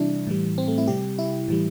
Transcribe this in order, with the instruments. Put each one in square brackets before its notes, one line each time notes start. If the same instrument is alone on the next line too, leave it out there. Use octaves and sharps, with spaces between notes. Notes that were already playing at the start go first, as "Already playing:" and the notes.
Already playing: [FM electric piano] C3 E3 G3 D4 E4
A2 E3 G3
C4
A3
E4
C3 G3 G4
E4
A2 E3 G3